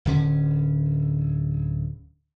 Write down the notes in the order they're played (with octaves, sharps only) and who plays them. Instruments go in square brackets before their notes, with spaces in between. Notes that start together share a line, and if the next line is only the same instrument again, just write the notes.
[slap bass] D1 D3 C#4